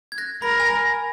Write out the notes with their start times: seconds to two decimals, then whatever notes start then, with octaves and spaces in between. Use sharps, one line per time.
0.12 G#6
0.18 F#6 A#6
0.42 A#4 B5
0.60 G#5